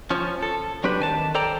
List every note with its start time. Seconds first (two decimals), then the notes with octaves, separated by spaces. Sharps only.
0.10 F3 C#4
0.43 A4
0.84 F#3 C4 D4 G4 B4
1.00 D#3 G#5 A5
1.35 A4 C5 D5 G5 A#5